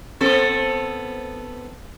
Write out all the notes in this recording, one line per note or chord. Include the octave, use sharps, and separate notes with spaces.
B3 C4 A4